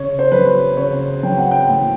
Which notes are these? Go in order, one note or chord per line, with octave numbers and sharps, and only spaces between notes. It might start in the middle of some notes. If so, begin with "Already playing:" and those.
Already playing: C#3 C#5
C5
F#3 B4
C#3 C#5
F#3 G5
F#5
G5
A2